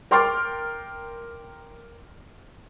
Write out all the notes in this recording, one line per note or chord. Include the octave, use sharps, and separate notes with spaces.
A#4 G5 C6 D6 F6 A6